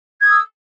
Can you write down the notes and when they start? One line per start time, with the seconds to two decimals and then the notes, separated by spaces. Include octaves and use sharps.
0.20 G#6
0.24 D#6
0.29 E6